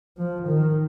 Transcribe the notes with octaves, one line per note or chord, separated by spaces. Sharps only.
F3
D#3